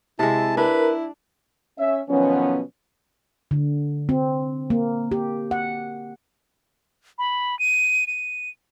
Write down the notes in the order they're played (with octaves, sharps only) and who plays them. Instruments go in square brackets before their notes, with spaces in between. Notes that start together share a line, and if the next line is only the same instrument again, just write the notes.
[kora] C3 G#3 [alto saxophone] E4 [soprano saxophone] A5
[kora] D4 [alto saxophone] E4 [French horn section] A#4 [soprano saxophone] B4
[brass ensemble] C#4 E5
B2 D#3 F3 F#3 B3 C#4
[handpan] D3
C4
A#3
G4
F#5
[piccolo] B5
D#7
D#7